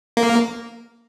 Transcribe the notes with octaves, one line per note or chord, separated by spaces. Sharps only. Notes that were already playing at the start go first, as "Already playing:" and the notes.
A#3